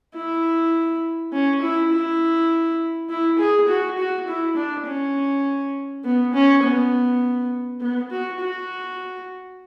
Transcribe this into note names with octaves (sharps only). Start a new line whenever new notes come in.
E4
C#4
E4
E4
E4
G#4
F#4
F#4
E4
D4
C#4
B3
C#4
B3
B3
F#4
F#4